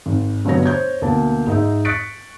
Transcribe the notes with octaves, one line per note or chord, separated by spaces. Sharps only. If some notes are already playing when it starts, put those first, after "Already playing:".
G#1
G1 B2 F#3 B3 C#5 A#6
C5 C#5 G6 G#6
D2 B2 A#3 A5
G#2 D#4 D#5 E5
C#6 F#6 A6 B6 C#7 D7